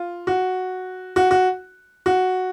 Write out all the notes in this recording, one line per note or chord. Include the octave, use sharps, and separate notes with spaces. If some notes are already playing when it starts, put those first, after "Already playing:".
Already playing: F4
F#4
F#4
F#4
F#4